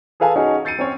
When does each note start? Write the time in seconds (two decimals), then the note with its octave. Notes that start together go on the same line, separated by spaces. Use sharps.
0.20 G#4 A4 B4 F5 G#5 A5
0.36 C#4 D#4 F#4 G#4
0.65 G6 A6 C7 C#7 D#7
0.79 C4 C#4 C#5